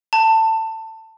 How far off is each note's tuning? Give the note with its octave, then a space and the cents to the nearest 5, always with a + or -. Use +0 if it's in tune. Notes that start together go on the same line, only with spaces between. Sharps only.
A5 +20